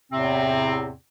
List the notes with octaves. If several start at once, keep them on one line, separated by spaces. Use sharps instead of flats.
E2 A2 C3 C4